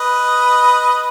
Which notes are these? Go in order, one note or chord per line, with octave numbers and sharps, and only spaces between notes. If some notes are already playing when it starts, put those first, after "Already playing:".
Already playing: B4 D#5